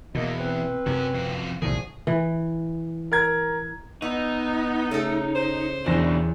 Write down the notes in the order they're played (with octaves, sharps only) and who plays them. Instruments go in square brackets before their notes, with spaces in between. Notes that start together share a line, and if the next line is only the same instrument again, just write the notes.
[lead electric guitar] E2 [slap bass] B2 [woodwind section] A#3 D#5
[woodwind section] C4 B4
[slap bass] F#2 C3 [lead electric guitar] C#4 F#4
[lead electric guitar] F2 F#4
[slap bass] B1 A2 D#3 [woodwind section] D3 F3 A3 [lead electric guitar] G#4
[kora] E3
[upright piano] A#4 A#5 G#6
[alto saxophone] B3 [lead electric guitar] D#4 [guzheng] E5
[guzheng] C#3 A4 [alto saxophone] A3
[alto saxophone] C5
[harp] E2 A#6 [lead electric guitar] B2 D4